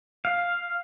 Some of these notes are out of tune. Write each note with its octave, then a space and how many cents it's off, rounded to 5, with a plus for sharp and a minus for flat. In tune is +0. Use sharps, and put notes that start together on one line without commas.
F5 +5